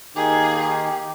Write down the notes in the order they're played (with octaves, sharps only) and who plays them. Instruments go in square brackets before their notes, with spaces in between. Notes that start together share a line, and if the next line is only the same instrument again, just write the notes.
[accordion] D#3 A#3 D#4 [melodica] G4 [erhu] G#4